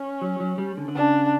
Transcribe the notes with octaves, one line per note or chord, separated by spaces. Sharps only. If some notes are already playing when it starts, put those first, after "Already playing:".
Already playing: C#4
F#3
F#3
G3
D3
D3
C#3 D4